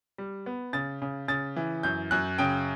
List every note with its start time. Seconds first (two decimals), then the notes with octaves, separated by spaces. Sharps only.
0.18 G3
0.46 B3
0.73 C#3 A6
1.02 C#3
1.28 C#3 A6
1.56 E3
1.83 F#2 G6
2.11 F#2 F#6
2.38 C#3 G5